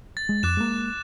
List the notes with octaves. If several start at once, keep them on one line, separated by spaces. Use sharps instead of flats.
A6
G#3
F2 D6 F#6 E7
G#3 A#3